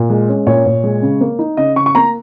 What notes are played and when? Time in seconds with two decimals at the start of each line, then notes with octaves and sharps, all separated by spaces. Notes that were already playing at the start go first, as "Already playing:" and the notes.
Already playing: A#2
0.10 G#3
0.29 C#4
0.47 A#2 C#5
0.66 A#2
0.84 G#3
1.02 C#3
1.21 A#3
1.39 D#4
1.57 C#3 D#5
1.76 C#3 C#6
1.86 C#6
1.95 A#3 A#5